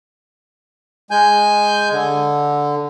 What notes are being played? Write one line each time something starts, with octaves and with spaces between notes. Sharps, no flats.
G#3 G#5 G6
D3